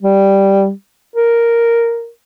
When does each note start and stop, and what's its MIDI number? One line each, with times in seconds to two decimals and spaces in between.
0.02 0.71 55
1.16 2.09 70